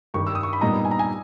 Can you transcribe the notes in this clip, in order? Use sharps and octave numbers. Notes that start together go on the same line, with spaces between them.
G2 D#3 G3 C#6
E6
D#6
C#6
B5
A#2 G3 B3 D#4 A#5
G#5
A#5
G#5